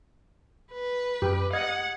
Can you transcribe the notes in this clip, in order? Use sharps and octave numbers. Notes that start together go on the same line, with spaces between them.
B4
F#2 G4
D#5 F#5 G#6